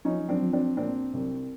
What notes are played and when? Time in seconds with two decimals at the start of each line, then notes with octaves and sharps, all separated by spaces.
0.05 F3 C#4 D#4
0.29 C4 D4
0.42 F3
0.53 C4 D4
0.77 A#2 C4 D4
1.14 C2